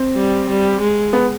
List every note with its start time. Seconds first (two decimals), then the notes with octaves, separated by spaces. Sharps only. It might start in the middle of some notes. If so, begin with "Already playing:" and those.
Already playing: C4
0.16 G3
0.49 G3
0.81 G#3
1.13 B3